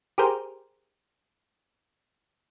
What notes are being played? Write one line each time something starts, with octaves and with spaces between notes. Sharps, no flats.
G4 G#4 A#4 C5